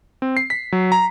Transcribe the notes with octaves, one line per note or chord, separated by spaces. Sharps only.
C4
C7
B6
F#3
A#5